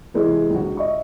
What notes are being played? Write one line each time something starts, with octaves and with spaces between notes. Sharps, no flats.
C3 E3 G#3 C4 E4 G4
C#2 D3 F#4
D#5 E5 C#6